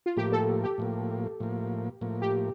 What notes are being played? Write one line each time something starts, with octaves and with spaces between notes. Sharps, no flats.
F4
A2 F3 A#3 G4
A4
G4
A2 F3 A#3
A2 F3 A#3
A2 F3 A#3
G4